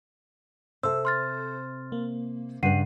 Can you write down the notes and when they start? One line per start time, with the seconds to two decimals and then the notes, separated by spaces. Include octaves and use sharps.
0.83 C3 A4 C5 E5 E6
1.05 C6 F6 A6
1.92 A#3
2.63 G2 C#3 B4 F#5 C7 D#7